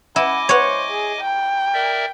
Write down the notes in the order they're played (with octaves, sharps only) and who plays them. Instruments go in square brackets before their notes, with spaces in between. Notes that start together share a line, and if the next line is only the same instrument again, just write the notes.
[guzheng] E4 [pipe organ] D#5 G#5 D6 [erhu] F#5
[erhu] C5 [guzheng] C#5 F#5
[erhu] G#4
G5
[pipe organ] A#4 D5 E5